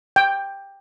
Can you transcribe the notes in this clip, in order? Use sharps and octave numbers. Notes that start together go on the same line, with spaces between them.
G5